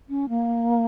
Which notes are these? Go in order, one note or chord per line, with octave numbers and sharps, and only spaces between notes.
C#4
A#3